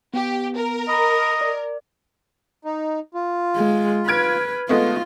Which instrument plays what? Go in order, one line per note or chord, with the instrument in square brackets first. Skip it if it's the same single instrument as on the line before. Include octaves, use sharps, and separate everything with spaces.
[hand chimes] B3 [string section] G4
[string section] A#4
[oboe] D#5 [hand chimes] A#5 B5
[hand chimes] D5
[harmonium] D#4
F4
[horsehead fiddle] G#3
[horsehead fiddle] B4 [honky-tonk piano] F6 G#6 D7
[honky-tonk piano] G#3 A3 B3 [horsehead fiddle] F4